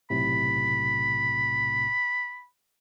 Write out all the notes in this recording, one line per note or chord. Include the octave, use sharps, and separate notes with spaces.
B1 A2 C3 B5